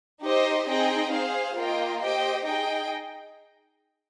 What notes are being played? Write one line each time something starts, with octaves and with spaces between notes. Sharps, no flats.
D#4 G4 C5 D#5
C4 D#4 G#4 D#5 G5
G#4 C5 F5
A#3 F4 A#4 D#5 G5
G4 C5 D#5 G5
D#4 G#4 D#5 G5